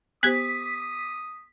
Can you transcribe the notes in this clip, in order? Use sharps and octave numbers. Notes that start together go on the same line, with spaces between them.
B3 G4 C5 D#6 F#6 G#6 B6